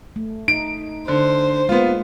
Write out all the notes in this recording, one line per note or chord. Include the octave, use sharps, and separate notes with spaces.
A3
D#4 D7
D3 C5
G#3 A#3 B3 F4